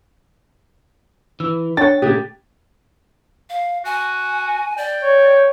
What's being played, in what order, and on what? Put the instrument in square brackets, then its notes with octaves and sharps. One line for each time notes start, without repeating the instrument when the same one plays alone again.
[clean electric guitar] E3 [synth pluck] E6
[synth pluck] D4 C#5 F#5 [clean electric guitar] G5 [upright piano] A6
[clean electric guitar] A#2 C#3 A3 [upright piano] G4 [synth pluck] D#6 F#6 G#6
[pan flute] F5
[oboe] F#4 [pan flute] G#5
[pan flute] D5 [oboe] G5
[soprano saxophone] C#5